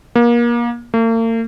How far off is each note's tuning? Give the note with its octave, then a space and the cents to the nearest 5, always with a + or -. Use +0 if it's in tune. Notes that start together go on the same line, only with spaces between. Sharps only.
A#3 +30
A#3 -45